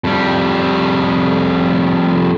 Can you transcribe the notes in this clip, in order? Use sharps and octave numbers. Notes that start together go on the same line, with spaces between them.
F2 G3